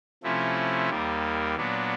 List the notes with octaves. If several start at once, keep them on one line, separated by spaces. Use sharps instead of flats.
C3 F3 A3 C#4 E4
D#2 D#3 G3 A#3
A#2 F#3 B3 D4